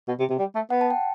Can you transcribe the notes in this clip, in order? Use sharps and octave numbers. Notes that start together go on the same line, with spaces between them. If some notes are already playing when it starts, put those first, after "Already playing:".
B2
C3
C3
G3
A3
B3 F#5
A5
G5